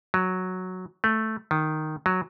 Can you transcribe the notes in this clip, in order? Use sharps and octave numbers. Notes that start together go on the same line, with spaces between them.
F#3
A3
D#3
F#3